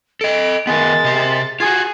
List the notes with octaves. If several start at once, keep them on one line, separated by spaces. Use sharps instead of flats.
A4 D#5 D7
D#3 G#3 A#3 B3 A6
C3 G4
F4 F#4 G#4 G#6